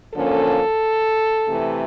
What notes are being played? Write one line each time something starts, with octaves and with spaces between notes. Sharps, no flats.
D3 F3 A#3 C#4 A4
C3 E3 A3